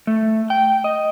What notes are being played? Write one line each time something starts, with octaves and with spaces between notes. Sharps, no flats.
A3
G5
D#5